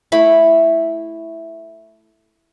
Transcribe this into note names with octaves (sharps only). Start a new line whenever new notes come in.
A3 E4 B5